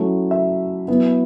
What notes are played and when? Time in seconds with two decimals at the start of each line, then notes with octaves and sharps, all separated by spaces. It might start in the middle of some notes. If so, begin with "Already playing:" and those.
Already playing: F#3 A3 C#4 E4
0.31 E5
0.88 F#3 B3 E4